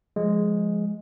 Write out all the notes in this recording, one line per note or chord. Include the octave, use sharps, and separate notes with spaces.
F3 G#3